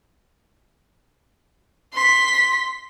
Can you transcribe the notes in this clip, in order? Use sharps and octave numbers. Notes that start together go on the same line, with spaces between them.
C6 B6